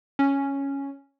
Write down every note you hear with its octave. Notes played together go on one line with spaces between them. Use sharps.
C#4